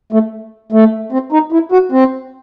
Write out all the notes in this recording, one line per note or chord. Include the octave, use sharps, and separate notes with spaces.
A3
A3
C4
D#4
E4
F#4
C4